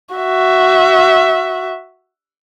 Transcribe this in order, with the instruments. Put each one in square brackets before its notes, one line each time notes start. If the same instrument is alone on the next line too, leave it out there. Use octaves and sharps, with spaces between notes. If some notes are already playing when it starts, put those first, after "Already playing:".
[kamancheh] F#4 E5